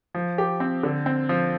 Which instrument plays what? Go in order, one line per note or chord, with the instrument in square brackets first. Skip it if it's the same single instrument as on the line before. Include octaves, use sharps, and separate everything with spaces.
[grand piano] F3
G4
C4
D3
C4
F3